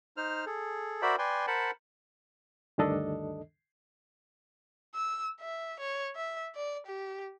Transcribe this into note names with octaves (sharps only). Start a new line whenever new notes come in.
D#4 C5 F6
G#4 A4
F#4 A#4 C5 D5 E5 B5
B4 D5 G5 G#5 C6
A#4 C5 F#5 A5 B5
D2 G2 D#3 D4 A4 D#5
E6
E5
C#5
E5
D5
G4